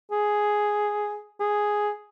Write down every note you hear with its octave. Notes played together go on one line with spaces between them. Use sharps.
G#4
G#4